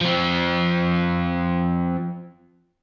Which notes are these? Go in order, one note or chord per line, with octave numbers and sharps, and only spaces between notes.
F3 C4